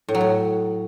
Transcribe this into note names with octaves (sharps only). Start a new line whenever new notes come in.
A2
F#3
A2